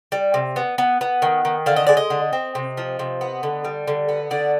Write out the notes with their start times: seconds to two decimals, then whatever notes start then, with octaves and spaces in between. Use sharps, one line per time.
0.12 G3
0.34 C3
0.56 B3
0.78 B3
1.01 B3
1.22 D#3
1.45 D#3
1.66 D3 F5
1.76 D#5
1.87 G#3 D5
1.97 D#5
2.10 D3
2.33 C4
2.55 C3
2.77 F3
2.99 C3
3.21 B3
3.43 D3
3.65 G3
3.87 D3
4.09 B3
4.31 D3 D5